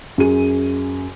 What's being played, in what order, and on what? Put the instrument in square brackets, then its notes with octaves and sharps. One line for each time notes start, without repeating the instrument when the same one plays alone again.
[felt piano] F#2 G#4 D#7